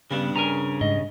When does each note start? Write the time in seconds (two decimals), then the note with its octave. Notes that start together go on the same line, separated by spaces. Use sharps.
0.11 G2 C#3 G3 B3 D4
0.36 C#3 A#4 G#5 A#5
0.81 G#2 D#5